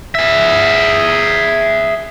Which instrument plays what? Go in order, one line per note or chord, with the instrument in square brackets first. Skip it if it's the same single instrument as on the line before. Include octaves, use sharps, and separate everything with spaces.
[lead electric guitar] G#4 E5